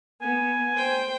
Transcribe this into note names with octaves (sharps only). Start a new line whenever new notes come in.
B3 G#5
C5 G5